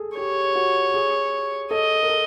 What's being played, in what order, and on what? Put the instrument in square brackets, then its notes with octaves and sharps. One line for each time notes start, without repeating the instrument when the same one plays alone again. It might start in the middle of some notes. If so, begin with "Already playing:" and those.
Already playing: [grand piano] G#4 A4
[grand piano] G4 [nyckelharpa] C#5
[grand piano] F#4
G#4
[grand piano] A4 [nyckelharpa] D#5
[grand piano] A#4
A4